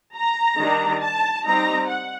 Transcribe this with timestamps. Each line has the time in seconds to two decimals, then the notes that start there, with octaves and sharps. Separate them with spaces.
0.15 A#5
0.58 D#3 G3 D4
1.00 A5
1.44 G3 C4 D#4 A#5
1.87 F#5